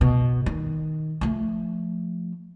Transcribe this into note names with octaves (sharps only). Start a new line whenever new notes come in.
B2
D#3
F3 A3